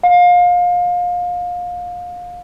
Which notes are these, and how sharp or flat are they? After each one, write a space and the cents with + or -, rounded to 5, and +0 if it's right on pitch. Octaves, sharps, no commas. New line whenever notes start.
F5 +25